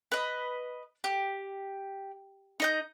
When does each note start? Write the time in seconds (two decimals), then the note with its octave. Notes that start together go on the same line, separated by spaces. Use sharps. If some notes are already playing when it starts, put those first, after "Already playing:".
0.12 B4 D#5
1.04 G4
2.60 D#4 D#5 G6